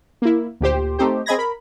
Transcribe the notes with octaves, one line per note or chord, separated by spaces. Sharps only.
A#3 E4
D2 A#2 G4 C5
A3 C4 D#4 G4 C5
C4 G#4 D#5 B5 G#6 A#6
A#4 B5